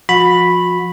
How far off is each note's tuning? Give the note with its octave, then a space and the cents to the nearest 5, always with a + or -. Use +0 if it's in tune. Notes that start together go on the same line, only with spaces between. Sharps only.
F3 +0 F#4 -40 B5 +0